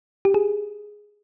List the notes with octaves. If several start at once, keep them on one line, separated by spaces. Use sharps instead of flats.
G4
G#4